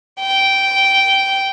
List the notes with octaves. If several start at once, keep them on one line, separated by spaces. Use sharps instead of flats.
G5